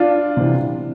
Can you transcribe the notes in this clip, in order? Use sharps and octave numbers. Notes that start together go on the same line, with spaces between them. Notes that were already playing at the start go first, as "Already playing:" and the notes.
Already playing: D4 F4
C3 E3